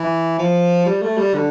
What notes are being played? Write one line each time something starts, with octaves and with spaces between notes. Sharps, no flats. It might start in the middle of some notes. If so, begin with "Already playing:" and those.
Already playing: E3
F3
G3
A3
G3
D3